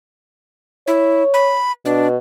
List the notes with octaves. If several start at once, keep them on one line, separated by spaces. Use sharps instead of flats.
E4 C#5
B5
B2 D4